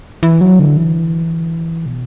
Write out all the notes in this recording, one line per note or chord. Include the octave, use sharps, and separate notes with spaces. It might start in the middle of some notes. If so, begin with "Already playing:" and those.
E3
F#3
D3
E3
B2